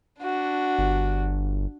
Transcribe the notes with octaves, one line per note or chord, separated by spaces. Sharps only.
D4 F#4
G1